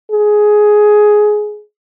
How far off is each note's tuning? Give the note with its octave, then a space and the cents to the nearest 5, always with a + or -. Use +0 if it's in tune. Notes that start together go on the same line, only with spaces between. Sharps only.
G#4 +10